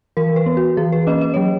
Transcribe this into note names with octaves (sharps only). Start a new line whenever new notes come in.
E3 A#4
B4
B3
F#4
E3 G#4
B4
A#3 C#4 D#5
D#5
F#3 C#5